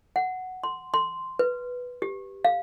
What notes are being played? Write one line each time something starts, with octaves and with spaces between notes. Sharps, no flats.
F#5
C6
C6
B4
G4
F5